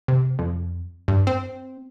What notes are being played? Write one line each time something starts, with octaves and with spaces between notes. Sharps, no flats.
C3
F2
G2
C4